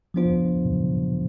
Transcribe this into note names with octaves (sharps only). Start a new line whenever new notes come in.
F3 B3 D4 F4 C5